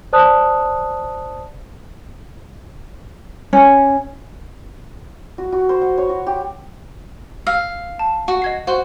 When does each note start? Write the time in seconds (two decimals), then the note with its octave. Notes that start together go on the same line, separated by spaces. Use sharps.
0.13 C5 D5 A5 D#6 F#6
3.53 C#4
5.38 F#4
5.52 F#4
5.69 C5
5.82 F#5
5.98 C#5
6.09 F#4
6.27 G4
7.47 F5 E6
7.99 A5
8.28 F#4
8.42 D#5 G#6 C7
8.67 F#4 C5 C6